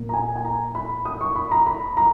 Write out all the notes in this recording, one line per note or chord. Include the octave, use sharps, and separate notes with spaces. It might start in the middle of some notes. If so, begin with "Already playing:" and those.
Already playing: A#2 A#3
A#5
G#5
G#5
A#5
B5
D#6
C#6
B5
A#5
B5
A#5